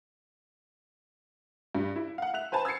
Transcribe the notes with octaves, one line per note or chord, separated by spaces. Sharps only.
G2
E4
F5 F#5
E5 F#6 F7
B4 C5 G#5 A5 B5
E6 G#6 A6 C7 C#7